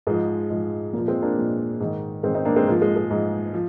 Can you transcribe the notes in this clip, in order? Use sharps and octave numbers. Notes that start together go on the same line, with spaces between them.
G#2 F3 G#3
G#2 F3
A#2 F3 A#3
G#3 C4
A#3 D4
A#2 F3
G#2 D#3
G#2 D#3 G#3 C4
C4 D#4
A#3 D4
G#3 C4
G#2 F3 A#3
G#3
G#3
G#2 F3
F3